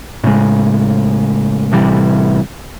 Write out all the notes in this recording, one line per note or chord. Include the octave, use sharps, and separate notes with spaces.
A2 C#3 G#3
A1 C3 E3 G3